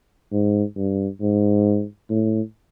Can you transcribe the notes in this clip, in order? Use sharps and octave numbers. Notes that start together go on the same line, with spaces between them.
G#2
G2
G#2
A2